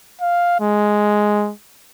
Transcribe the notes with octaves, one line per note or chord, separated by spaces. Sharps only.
F5
G#3